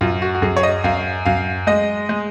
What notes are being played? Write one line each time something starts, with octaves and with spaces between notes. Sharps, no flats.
F#2 F4
F#4
F#4
F#2 G#4
C#5
D#5
F#2 F5
F#2 F5
G#3 D#5
G#3